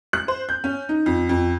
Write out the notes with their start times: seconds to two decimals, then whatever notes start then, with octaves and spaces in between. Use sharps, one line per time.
0.13 F#6
0.28 C5
0.49 G6
0.64 C#4
0.89 D#4
1.06 F2
1.29 F2